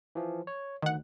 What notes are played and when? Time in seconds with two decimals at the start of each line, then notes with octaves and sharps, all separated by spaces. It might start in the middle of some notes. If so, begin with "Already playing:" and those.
0.15 E3 F3
0.47 C#5
0.82 D2 D#3 F#5